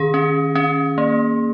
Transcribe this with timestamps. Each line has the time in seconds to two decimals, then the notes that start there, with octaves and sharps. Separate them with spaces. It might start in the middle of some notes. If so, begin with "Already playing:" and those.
Already playing: D#3 C#4 G#4
0.14 C#4
0.55 C#4
0.98 A#3